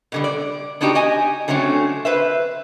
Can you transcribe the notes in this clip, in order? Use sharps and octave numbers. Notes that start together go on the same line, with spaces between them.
B2 D3 G3
D5
B3 D4 D#4 F#4 G4
G4 D#5 G#5
D3 F#3 A3 C4 C#4
B4 C5 E5